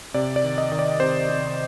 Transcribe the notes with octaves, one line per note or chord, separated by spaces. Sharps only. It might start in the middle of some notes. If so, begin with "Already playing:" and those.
C3 D5
D5
D#3
D#5
D#3
D5
C3 C5
C3